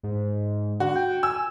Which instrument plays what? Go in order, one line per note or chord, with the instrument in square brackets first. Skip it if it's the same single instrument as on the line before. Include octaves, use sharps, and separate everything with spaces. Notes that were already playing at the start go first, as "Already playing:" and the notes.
[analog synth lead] G#2
[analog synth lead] D3 [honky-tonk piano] F#4
[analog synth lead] G5
[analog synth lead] G#5 [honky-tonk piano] E6